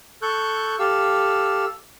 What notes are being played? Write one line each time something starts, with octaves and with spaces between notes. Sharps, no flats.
A4 C#6 F#6 G6
G4 A4 F5 E6